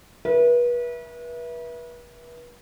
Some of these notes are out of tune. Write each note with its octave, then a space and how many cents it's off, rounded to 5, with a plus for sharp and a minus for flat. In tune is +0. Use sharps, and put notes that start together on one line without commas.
B4 -35 E5 +0